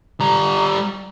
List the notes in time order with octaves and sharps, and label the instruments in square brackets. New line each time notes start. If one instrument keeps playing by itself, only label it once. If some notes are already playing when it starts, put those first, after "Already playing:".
[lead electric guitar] G3 A#5